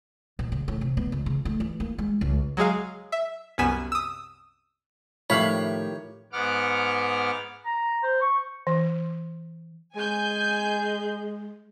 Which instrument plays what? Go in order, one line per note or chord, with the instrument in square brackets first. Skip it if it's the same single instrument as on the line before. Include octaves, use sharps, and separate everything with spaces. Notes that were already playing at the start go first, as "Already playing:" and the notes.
[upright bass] A#1
C#3
A2
C3
B3
C#2
C#3
A3
E3
A#3
G#3
C#2
[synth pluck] F#3 G#3 G#4 F5
E5
C2 F#2 B3 G#5 B6 E7
D#6 E6
[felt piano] A2 F3 [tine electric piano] D#3 G4 [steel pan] E4 F5 B5 [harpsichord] C#5
[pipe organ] G#2 B3 F#5 D6 F6
[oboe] A#5
C5
C#6
[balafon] E3
[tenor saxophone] G#3 [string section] G#5 G6